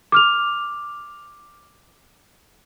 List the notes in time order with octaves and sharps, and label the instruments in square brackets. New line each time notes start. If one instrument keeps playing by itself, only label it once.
[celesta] D6 F6 F7